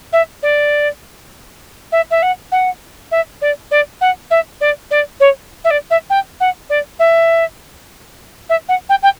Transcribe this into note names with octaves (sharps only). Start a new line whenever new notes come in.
E5
D5
E5
E5
F#5
F#5
E5
D5
D5
F#5
E5
D5
D5
C#5
E5
D5
E5
G5
F#5
D5
E5
E5
F#5
G5
G5